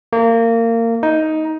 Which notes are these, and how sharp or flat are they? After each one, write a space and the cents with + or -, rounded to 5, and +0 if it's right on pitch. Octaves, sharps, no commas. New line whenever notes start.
A#3 -25
D#4 +10